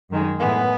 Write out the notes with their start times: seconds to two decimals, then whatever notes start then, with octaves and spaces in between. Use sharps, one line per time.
0.10 F#2 D#3 G#3
0.39 A2 E3 G#3 B3